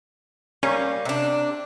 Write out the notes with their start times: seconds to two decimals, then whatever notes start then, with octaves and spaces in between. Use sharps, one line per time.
0.63 G3 A#3 C#4
1.05 C3 D4